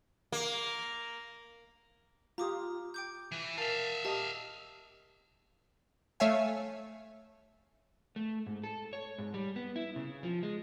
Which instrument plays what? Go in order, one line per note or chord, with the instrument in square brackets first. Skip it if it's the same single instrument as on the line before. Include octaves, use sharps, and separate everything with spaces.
[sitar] A#3
[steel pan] F4 G4 [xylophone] A#5 D6 D#6
[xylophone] G5 D6 G6
[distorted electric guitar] E3
[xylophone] A#4 [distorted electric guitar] E5 F5 [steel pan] A5
[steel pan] G4 D#5 D#6 [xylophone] A5
[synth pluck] A3 C#5 E5 F5 G#5
[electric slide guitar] A3
G#2
A4
C#5
G#2
G3
B3
E4
C#3
F3
G#3